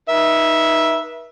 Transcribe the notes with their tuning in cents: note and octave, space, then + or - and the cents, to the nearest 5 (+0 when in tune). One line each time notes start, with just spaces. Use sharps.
D#4 +0 B4 -40 E5 +0